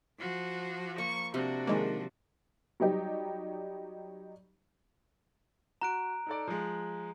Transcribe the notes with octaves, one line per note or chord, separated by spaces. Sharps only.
F3 F#4
A#3 C#6
C3 D4 F#4
D#3 F3 G#3 A#3
F#3 G3 D#4 G4
F#4 A#5 F#6 D7
D#4 A4 D5
F3 G#3